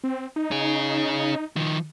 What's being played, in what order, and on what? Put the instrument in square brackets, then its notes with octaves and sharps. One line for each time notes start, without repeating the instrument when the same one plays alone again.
[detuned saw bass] C4
D#4
[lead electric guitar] C#4 G#4
D#3 F3